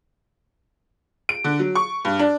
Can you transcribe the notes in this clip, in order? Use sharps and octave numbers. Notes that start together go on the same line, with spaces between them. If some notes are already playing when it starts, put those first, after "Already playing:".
D7
D3
F#3
C#6
G2
D4